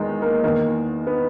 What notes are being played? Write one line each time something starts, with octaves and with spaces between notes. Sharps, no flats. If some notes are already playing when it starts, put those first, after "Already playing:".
Already playing: E2 D#3 G#3
A#3
E2 D#3 A#3
B3